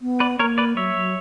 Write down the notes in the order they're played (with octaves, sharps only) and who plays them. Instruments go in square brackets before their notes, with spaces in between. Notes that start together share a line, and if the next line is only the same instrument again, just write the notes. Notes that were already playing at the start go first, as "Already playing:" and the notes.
[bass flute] B3
[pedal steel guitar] B4 D5
[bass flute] A#3 [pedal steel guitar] A#4 C#5
[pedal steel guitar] B4 D5
[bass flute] F#3 [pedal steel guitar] C#5 E5
[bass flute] F#3